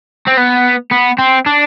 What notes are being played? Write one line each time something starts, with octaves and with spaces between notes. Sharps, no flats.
C4
B3
B3
C4
D4